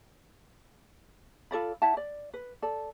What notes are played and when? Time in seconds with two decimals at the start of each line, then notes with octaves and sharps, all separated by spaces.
1.51 F4 A4 D5 B5
1.82 E4 E5 F#5 A5
1.97 D5
2.34 B4
2.62 A4 D5